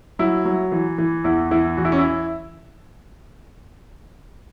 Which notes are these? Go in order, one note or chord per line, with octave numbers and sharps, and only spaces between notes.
F#3 E4
F#3
E3
E3
E2 E4
E3 E4
E2 F#4
E4
C#4
E4